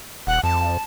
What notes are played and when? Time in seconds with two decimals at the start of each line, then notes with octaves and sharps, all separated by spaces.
0.27 D#1 F#5
0.44 F2 A5